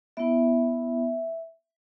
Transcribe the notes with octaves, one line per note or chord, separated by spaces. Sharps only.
B3 E4 E5